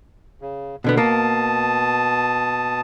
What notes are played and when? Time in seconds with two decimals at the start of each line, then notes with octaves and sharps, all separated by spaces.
0.41 C#3
0.84 B2 D3 B3
0.97 B2 A#3 A5 D#6